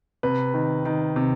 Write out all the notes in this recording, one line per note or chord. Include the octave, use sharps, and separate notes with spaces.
C3 B4
D#3
D#3
C3